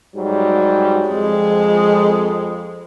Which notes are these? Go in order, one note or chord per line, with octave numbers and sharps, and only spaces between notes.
G#2 F#3 G3
F2 G#3